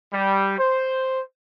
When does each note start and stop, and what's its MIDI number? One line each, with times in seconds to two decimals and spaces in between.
0.13 0.57 55
0.58 1.20 72